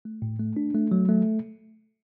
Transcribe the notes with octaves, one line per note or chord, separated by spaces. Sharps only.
A3
A2
A3
D4
A3
F#3
A3